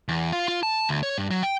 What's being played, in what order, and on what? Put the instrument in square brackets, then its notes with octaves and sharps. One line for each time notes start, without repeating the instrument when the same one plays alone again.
[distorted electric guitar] E2
F4
F4
A5
D2
C#5
G2
F#3
G5